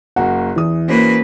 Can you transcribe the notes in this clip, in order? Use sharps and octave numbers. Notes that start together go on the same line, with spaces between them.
F#1 A#3 F#4 F#5 A#5
E2 E3 D#6
A#3 C#4 F#4 B4 C5